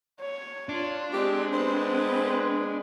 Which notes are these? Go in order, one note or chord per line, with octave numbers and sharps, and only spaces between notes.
C#5
D4 F4
G#3 C4 G4
B3 C4 B4 C5